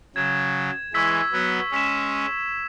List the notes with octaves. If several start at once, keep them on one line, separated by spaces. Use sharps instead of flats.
C#3 F#3 G#6 E7
E3 G#3 C#6 E6 G#6 B6
F#3 B3
G#3 C#4 E6 B6 E7